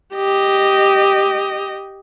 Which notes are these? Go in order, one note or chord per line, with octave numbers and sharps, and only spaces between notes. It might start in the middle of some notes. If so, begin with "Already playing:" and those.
G4 D#5